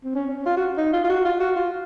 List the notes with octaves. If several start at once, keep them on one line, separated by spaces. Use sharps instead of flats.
C4
C#4
C#4
F4
F#4
D#4
F4
F4
F#4
F4
F#4
F4